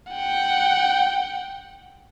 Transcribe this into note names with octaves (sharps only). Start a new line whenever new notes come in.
F#5 G5